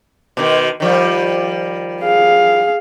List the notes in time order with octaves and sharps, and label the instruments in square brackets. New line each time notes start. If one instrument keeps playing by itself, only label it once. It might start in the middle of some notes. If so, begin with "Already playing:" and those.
[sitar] B2 D#3
D#3 F3 G3
[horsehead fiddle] G#4 F5